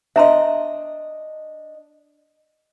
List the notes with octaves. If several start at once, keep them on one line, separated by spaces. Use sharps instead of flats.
D4 D#5 E5 A#5 C6